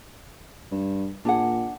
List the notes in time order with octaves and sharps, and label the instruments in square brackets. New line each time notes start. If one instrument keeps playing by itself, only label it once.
[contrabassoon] G2
[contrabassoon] A#2 [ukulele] D4 G#4 F#5